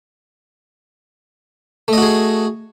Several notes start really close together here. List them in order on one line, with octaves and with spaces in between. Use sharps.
A3 D#5 F#4 G#4